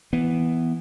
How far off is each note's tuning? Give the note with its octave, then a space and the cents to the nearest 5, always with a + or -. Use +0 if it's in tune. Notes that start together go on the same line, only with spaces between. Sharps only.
E3 +0 B3 +0